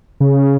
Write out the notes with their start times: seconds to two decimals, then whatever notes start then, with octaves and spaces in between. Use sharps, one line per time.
0.20 C#3